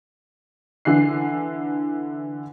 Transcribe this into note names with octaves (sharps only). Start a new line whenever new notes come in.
D3 E3 F#6 C7